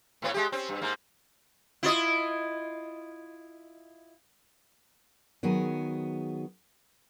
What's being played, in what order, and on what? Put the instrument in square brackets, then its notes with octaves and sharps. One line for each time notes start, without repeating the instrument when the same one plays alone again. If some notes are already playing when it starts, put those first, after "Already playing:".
[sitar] A2 B3 C#5
G#3 G4
C4 C#4
G2
G#2 A#3
E4 F4 D#5
[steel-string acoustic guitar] D#3 F#3 B3 G#4